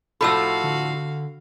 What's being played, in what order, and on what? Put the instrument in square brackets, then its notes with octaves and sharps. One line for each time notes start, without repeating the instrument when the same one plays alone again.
[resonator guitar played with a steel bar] A2 F3 A4 [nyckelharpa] F#4 F5 [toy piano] B5 E6
[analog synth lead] D3